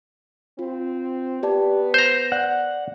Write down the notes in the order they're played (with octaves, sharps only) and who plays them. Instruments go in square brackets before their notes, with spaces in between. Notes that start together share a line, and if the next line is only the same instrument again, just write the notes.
[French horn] C4 [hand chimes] F4
[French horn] B3 [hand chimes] G4 D5 A5
[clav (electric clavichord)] C5 A#5 [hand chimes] G6
[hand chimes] D5 [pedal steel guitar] F#5